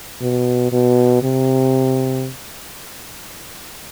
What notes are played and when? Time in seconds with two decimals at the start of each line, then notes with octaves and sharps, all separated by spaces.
0.21 B2
0.72 B2
1.23 C3